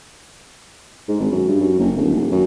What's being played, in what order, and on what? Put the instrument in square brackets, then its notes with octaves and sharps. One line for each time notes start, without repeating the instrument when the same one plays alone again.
[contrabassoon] G#2
G#1
F#2
G2
F#2
F#1
D1
D#1
F#2